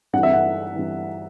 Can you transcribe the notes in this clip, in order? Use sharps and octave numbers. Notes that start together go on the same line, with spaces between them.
G2 E3 F#5
E5
F#5
G2 E3